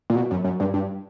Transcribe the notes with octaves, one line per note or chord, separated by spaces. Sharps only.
A#2
B2
F#2
F#2
G2
G2